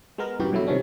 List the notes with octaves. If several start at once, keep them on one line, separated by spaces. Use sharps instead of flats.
G#3 B3 A#4
G2 C#3 E3 B3 F#4 G4
G2 B2 E3 F#3 A3 E4
C3 D#3 F3 C#4 D4